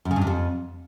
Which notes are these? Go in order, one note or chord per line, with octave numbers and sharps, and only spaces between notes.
F#2
C#3
G2
C3
F2